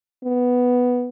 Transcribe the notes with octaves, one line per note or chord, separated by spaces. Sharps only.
B3